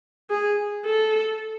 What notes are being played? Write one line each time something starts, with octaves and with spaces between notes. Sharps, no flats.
G#4
A4